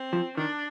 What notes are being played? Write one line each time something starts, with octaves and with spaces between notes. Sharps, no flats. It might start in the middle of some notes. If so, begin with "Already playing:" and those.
Already playing: C4
F3
D#3 D4